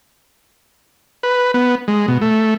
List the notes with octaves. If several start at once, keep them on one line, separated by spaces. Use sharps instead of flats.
B4
B3
G#3
B2
A3